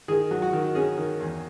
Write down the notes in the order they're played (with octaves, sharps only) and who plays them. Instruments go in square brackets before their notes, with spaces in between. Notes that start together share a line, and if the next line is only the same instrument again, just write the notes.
[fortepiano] D#3 G#4
F#3
F#4
D#3
C#4 G#4
D#3
E2